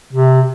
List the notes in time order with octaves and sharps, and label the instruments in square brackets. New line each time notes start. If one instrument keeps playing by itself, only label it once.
[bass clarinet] C3